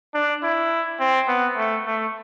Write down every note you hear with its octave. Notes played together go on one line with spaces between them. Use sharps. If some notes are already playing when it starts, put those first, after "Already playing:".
D4
E4
C4
B3
A3
A3